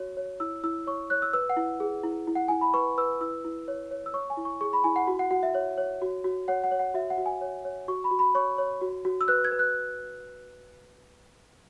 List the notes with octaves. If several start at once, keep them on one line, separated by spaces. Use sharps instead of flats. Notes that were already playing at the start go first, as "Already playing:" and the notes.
Already playing: F#4 C#5
C#5
E4 E6
E4 E6
C#5 C#6
C#5 F#6
E6
B4 E6
F#5
E4
G#4
E4
E4
F#5
E4 G#5
B5
B4 C#6
B4 E6
E4 E6
E4
C#5
C#5
E6
C#5 C#6
G#5
E4
C#6
G#4 C#6
B5
E4 G#5
F#5
F#4
F#5
F#4 F#5
E5
C#5
C#5
F#4
F#4
C#5 F#5
F#5
C#5
F#5
F#4 E5
F#5
F#4
G#5
C#5
C#5
F#4 C#6
B5
F#4
B5
C#5 C#6
C#5
F#4
F#4
E6
B4 F#6
G#6
B4
F#6